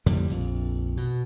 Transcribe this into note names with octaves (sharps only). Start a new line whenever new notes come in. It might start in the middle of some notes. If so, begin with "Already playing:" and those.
F2 A2 D3 G3
A#1 F2
B2